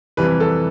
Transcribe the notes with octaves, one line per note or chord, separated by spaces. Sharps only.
F2 C3 E3 G3 B4
A4